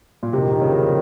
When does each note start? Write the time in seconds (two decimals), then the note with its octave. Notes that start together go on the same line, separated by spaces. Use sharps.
0.23 A#2
0.33 F#1 F2 C3 D#3
0.61 C#3